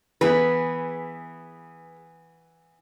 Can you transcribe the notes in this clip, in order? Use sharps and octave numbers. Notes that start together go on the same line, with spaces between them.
E3 B3 G#4 B4